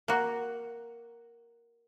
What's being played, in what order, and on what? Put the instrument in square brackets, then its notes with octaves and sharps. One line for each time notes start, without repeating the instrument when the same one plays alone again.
[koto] A#3 F#4